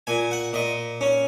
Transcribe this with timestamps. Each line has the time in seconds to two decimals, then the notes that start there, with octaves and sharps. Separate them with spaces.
0.07 A#2 G#5
0.31 F#5
0.53 A#2 D#5
1.01 C#4